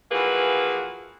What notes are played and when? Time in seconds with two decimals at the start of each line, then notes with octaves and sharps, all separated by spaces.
0.12 E3 F3 A#3 F#4 G#4 B4